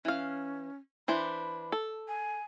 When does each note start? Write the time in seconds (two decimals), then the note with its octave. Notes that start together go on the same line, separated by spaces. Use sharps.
0.05 E3 C#4 F5
1.08 E3 D4 C5 B5
1.72 A4
2.08 G#5